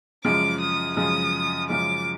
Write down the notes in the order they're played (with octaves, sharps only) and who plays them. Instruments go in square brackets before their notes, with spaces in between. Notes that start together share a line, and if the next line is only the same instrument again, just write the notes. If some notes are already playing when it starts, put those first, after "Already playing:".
[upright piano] F#2 C#3 F3 G#3 [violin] D6
[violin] D#6
[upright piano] F#2 C#3 F3 G#3 [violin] D#6
[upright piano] F#2 C#3 F3 G#3 [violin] D6